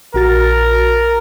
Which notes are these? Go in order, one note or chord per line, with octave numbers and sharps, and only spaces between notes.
A#1 F#4 A#4 A6